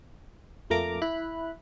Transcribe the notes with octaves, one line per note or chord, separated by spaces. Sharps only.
F2 A3 A#3 A#4 A#5 D6
E4 B5 F#6